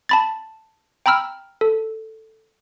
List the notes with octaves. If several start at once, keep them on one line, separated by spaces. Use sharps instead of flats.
A5 B5 A6
G5 A#5 B5 E6 F6
A4